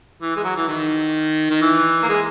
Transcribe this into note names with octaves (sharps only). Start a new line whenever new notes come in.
E3
G#3
F#3
E3
D#3
D#3
E3
A#3
G#3